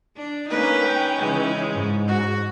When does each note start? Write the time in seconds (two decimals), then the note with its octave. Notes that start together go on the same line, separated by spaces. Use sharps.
0.17 D4
0.50 A#3 C#4 D#4 B4
0.83 G5
1.18 C#3 E3 G#3
1.72 G#2
2.08 F#4